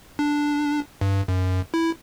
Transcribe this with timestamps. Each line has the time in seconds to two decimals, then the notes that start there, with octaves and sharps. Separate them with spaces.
0.19 D4
1.01 G2
1.28 F#2
1.74 E4